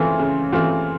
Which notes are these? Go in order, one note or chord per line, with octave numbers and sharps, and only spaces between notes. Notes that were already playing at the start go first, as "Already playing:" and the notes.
Already playing: C#3 E3 A3 C4 F4
C#3
E3 A3 C4 F4